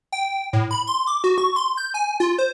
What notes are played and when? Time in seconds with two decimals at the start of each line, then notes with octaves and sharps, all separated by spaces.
0.12 G5
0.53 A2
0.71 B5
0.87 C6
1.07 D6
1.24 F#4
1.38 C#6
1.56 C6
1.77 G6
1.94 G#5
2.20 F4
2.38 C5